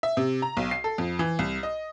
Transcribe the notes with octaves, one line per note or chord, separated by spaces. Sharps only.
E5
C3
A#5
B1
C7
A4
F2
E3
C2
D#5